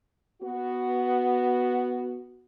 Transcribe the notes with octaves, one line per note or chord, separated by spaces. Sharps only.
B3 F#4